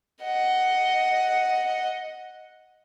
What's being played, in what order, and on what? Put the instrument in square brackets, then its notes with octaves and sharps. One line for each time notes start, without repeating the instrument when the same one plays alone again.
[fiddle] D#5 F#5